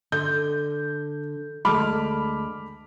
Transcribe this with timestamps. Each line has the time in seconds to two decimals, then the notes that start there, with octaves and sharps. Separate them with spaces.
0.12 D3 G6
1.65 D2 G#3 A5 B5 D6 F6